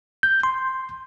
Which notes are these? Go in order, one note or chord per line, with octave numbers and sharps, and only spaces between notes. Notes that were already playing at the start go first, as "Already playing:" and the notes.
G6
C6